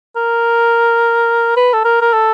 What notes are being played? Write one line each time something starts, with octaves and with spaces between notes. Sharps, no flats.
A#4
B4
A4
A#4
A#4
A4